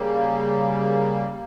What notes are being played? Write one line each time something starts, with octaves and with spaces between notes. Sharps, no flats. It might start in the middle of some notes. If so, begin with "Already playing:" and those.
Already playing: C#3 G3 A#3
G3